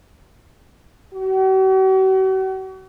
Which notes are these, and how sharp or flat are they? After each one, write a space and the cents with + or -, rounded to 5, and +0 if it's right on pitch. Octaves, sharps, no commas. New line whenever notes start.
F#4 +45